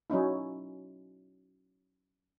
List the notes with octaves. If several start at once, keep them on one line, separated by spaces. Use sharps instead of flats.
F#3 C#4 D#4 E4